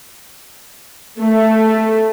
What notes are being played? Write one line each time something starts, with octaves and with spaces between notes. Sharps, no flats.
A3